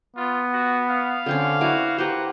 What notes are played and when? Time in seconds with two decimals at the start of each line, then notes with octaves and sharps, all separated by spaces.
0.16 B3 F4
0.53 F#4
0.90 F5
1.26 D3 C4 C#4
1.61 E4 F#4 B4 D6
1.98 A#3 G4 B4 C5 F#5